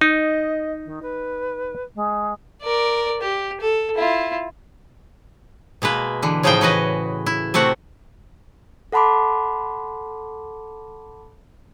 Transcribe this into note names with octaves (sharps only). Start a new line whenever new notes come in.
D#4 D#5
D#3
B4
G#3
A#4 D5
G4
A4
E4 F4
B2 G#3 A#3 B4
D3 E3
A2 C#3 F3 D#4 G#4 G5
E3 F#4 B4 D#5
E4
C3 A3 C4 F#4 F#5
A4 F#5 A5 B5 C6 D6